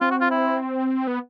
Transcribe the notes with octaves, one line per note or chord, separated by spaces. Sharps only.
C4 F4
F#4
F4
E4
B3